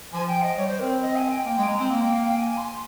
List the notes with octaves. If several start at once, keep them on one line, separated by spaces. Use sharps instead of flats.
F3 G#5
G5
D#5
G3 C#5
C5
C4 A#4
C5
C4 D#5
G#5
G5
A#3 G5
G#3
G#5
G#3 A#5
C4
A#3
G5
F5
G5
G#5
C6